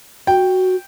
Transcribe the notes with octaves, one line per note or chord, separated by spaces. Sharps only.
F#4 G5